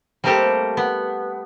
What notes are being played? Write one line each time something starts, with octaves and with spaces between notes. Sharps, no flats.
G3 A3 A#3 C4 G4 A4
B3